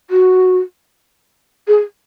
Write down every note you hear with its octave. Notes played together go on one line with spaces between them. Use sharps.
F#4
G#4